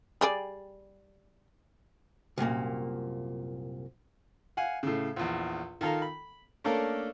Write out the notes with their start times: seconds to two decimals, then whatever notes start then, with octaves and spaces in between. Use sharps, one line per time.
0.21 G3 G#4 D5
2.38 C2 F#2 A#2 A#3
4.57 F5 F#5 G#5
4.83 A2 C#3
5.16 A#1 E2
5.81 D#3 F4 A4 F5 A#5
6.02 B5
6.64 A3 A#3 C#4 D4 A4 A#4